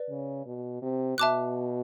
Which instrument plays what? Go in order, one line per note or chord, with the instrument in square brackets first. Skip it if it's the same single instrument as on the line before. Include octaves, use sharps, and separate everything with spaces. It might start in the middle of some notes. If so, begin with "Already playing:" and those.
Already playing: [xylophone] B4 D5
[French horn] C#3
B2
C3
[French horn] B2 [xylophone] E5 A5 D6 F#6